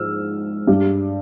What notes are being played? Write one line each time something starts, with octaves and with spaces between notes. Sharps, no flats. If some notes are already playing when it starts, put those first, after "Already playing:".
Already playing: G#2 F3 E6 F6
G2 G3